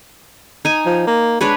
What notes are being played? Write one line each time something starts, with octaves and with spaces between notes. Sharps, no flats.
D#4 G#5
F3
A#3
G#3 D4 B4 C#5